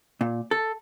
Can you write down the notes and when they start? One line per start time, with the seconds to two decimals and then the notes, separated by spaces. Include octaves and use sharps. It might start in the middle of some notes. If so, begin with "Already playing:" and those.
0.21 A#2
0.51 A4